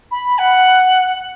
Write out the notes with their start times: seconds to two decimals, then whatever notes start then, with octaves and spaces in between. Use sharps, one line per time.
0.11 B5
0.38 F#5